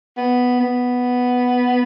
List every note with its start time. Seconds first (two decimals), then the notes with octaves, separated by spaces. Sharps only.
0.17 B3
0.60 B3